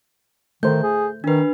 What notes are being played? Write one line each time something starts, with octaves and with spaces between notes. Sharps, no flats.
D#3 A3 C5 G6
G#4
D#3 D4 B4